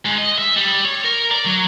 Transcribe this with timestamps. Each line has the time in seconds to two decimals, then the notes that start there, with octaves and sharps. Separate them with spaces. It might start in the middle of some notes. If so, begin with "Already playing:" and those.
0.05 G#2
0.18 D#5
0.38 E5
0.56 G3
0.85 C#5
1.04 A#4
1.31 D5
1.46 F#3